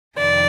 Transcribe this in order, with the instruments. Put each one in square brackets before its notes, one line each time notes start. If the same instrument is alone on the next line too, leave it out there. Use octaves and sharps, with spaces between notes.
[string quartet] F2 C3 D#3 D5